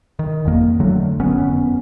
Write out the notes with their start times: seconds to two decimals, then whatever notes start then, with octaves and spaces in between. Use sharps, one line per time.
0.19 D#3
0.45 G1 F2 A#3
0.80 D3 F#3 A3
1.19 F1 F#2 B3 C#4